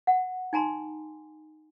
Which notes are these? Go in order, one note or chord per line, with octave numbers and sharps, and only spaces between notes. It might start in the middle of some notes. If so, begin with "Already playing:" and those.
F#5
D#4 G#5 A#5 C6